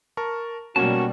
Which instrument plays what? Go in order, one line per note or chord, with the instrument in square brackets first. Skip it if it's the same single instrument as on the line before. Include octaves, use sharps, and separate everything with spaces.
[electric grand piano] A#4 A5 C#6
[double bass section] B2 G3 [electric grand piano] A#3 C#4 [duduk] F#4 [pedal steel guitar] A5 C#6